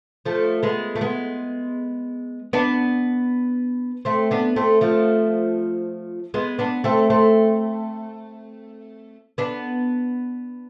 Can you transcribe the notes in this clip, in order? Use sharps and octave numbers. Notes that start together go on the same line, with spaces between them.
F3 A3
G#3 B3
A3
G#3 B3
B3 D4
A3 C4
B3 D4
A3 C4
F3 A3
G#3 B3
B3 D4
A3 C4
A3 C4
B3 D4